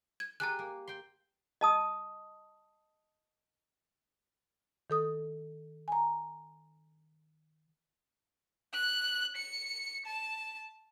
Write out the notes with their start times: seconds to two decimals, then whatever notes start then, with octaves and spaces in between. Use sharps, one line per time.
0.20 G#6
0.40 G#3 G4 A4 A#5 F#6
0.59 A#3
0.87 G5 C6
1.61 D#5 A5 D#6
4.90 D#3 A4 D#6
5.88 G#5 A#5
8.74 F#6
9.37 C#7
10.06 A5